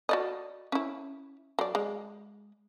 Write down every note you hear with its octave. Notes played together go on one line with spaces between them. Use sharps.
F#4 D5 D#5
C#4 E4
F#3 D5
G#3